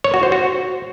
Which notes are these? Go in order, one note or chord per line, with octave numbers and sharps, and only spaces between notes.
C#5
F#4
C5
F#4